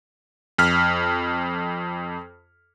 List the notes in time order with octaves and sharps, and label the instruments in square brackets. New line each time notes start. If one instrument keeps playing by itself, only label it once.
[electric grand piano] F2 F6 B6